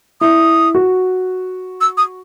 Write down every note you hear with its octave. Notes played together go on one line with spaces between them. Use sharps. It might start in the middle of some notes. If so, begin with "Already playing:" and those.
E4 D#6
F#4
E6
D#6